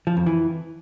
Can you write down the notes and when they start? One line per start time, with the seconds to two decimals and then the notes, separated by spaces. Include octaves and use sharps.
0.07 F3
0.17 F2
0.26 E3